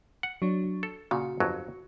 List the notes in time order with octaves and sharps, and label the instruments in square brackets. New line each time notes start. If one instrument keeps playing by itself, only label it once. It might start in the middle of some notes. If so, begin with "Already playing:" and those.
[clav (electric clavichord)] F#5
[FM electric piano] F#3 D4
[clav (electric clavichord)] A4
[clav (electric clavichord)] A#2 C#3 [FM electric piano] F#4
[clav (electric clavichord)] G1 F2 F#3